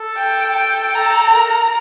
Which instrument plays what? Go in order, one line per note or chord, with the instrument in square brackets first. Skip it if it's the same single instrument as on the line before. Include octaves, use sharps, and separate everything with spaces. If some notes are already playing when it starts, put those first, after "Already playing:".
Already playing: [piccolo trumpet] A4
[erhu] G5
G5
[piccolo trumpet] A4 [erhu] A#5
[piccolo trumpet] A#4